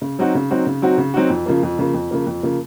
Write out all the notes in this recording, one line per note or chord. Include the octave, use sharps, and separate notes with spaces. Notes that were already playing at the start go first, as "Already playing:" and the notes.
C#3
F#3 C4 D#4 F#4
C#3
F#3 C4 D#4 F#4
C#3
F#3 C4 D#4 F#4
C#3
F#3 C4 D#4 F#4
F2
C#3 F3 A#3
F2
C#3 F3 A#3
F2
C#3 F3 A#3
F2
C#3 F3 A#3